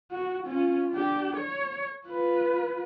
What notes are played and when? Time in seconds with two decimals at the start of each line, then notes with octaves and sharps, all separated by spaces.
0.11 F#4
0.47 C#4 F4
0.92 D4 G4
1.36 C#5
2.07 F4 B4